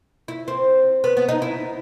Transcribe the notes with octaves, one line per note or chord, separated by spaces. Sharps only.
E4
C4
B3
B3
D#4
E4